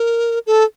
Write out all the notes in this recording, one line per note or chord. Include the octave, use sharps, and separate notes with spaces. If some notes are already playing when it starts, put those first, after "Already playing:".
Already playing: A#4
A4